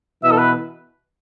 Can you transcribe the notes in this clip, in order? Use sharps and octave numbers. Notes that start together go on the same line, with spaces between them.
B2 E3 E5
A4
B4